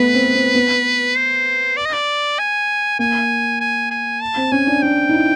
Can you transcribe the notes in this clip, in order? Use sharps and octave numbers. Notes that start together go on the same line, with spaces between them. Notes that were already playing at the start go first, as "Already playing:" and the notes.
Already playing: A3 B3 B4
C4
C4
B3
C5
D5
D#5
D5
G#5
A#3 G#5
G#5
G#5
A5
C4
C#4 G#5
D4
D4 G5
D#4
E4